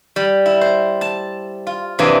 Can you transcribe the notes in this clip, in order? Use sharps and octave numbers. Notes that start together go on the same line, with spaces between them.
G3
E4
C5
A5
F4
C3 E3 F#3 A#3 D4 G#4